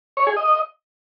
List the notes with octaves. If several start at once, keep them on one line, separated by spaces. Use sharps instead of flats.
C#5
G#4
D#5